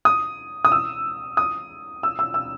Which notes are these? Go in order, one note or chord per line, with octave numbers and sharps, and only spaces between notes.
D#6
D#6
E6
D#6
E6
E6
E6